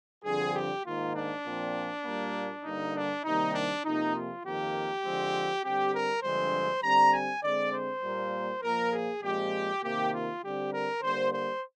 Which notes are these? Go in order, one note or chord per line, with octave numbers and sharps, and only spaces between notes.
G2 D3 F3 C4 G#4
G4
G#2 D#3 A#3 F4
D4
A#2 F3 C4
A#2 G3 A#3
G2 D3 G3 A#3 D#4
D4
C3 D#3 G3 A#3 D#4
D4
F2 C3 F3 A#3 D#4
F4
F2 D#3 A#3 G4
D3 F3 G#3 C4
D3 G3 C4 G4
A#4
G2 D3 F3 G#3 C4 C5
D3 G3 C4 A#5
G#5
D3 G#3 C4 D5
C5
A#2 G3 A#3
A#2 F3 A#3 A#4
G#4
A#2 F3 G#3 C4 G4
C3 D#3 A#3 G4
F4
D3 G3 C4 G4
A#4
D3 G3 A#3 C5
C5